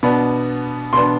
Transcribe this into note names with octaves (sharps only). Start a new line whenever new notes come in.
B2 B3 D4
B2 B3 D4 C6